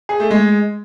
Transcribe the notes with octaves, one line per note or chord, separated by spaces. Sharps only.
G#4
A3
G#3